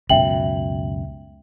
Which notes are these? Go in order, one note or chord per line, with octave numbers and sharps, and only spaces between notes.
C#2 F#2 B2 E5 G5 F#7